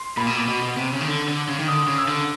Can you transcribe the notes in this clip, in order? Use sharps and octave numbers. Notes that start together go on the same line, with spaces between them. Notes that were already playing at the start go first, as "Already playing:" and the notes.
Already playing: C6
A#2 B5
B2
A#2
B2
B2
C3
C#3
D#3
D3
D3
C#3
D#3
D3 D#6
C#3
E6
D3